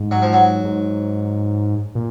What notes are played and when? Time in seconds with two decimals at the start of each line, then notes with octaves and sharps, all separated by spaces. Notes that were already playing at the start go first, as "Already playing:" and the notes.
Already playing: G#2
0.11 F#3
0.22 F3
0.33 F#3
0.64 G#2
1.95 A#2